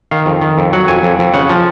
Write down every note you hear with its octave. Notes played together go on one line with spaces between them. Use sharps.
D#3 F5
F2
D#3
F2
F#3 F#5
F2 G#5
F2
F2
C#3 F#5
F3